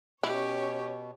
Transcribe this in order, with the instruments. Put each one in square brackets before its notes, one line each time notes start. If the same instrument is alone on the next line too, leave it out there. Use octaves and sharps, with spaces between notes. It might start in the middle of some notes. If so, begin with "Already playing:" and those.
[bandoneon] B2 [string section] C#4 C#5 [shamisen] E4 [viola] G4